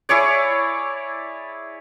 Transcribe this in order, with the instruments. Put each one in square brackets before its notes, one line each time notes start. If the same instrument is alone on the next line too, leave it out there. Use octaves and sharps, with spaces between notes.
[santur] E4 G#4 C#5 D5